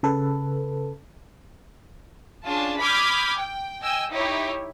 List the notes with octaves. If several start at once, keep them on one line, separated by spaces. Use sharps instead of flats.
C#3 A4 B4
C#4 D4 F4 G#4 A5
B5 D6 D#6 F6 G6 G#6
G5
D#5 G5 G#5 E6
D#4 E4 G4 C#5